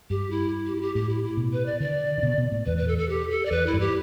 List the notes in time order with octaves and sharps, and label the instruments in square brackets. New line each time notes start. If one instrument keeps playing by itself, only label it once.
[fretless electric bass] G2 [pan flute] G4
[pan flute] E4
G4
E4
G4
[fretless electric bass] A2 [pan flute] G4
[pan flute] E4
E4
[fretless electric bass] B2
[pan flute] B4
D5
[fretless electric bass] D3 [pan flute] D5
[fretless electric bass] D3
B2
B2
A2
[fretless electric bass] E2 [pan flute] B4
[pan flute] B4
A4
A4
G4
A4
D5
[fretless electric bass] E2 [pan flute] B4
[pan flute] E4
[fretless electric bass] G2
[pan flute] G4